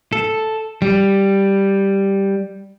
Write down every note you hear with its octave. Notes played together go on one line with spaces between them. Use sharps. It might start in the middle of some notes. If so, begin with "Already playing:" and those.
A4
G3